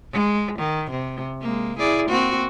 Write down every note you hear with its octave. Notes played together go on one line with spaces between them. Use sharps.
G#3
D#3
C3
G#3 A#3
E4 G#4 D5
A#3 C4 F#4